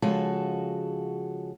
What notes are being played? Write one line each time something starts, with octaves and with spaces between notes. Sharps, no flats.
C#3 F3 G#3 F#4 A4